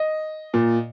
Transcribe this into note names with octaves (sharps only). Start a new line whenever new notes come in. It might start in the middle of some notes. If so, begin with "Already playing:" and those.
Already playing: D#5
A#2